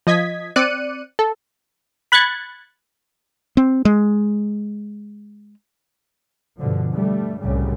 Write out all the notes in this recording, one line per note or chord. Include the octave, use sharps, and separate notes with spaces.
F3 D#5 G#6 B6
C4 D5 F#6 C#7 D#7
A4
B5 F#6 G#6 A6 C#7
C4
G#3
G2 B2 D3 F3
G2 G3 A3
C2 F#2 A2 C#3 G3